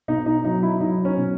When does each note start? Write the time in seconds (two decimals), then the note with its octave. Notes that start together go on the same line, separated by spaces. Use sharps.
0.08 B2 D#4
0.26 D#4
0.44 F#3 D#4
0.63 E4
0.80 F#3 D#4
1.05 C#4
1.17 B2